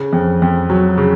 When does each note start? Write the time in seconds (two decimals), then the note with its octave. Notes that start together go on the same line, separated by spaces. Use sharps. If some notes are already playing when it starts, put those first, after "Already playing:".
Already playing: C#3
0.13 F2
0.42 F2
0.70 F#3
0.98 C#3